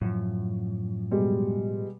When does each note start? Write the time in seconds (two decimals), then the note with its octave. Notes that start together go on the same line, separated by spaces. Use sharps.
0.01 F#2 A2 F3
1.11 B2 G3 G#3